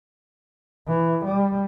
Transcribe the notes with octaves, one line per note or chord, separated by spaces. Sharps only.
E3
G3